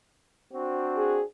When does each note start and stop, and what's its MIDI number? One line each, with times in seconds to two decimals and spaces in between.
0.54 1.21 60
0.54 1.21 62
0.54 1.21 66
0.97 1.23 68